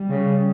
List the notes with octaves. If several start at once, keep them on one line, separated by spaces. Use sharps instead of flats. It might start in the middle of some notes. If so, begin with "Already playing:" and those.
Already playing: G3
C#3